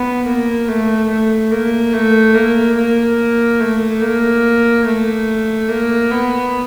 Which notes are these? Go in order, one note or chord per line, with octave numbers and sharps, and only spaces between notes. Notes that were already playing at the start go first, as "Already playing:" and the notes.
Already playing: B3
A#3
A3
A3
A#3
A3
A#3
A#3
A3
A#3
A3
A#3
B3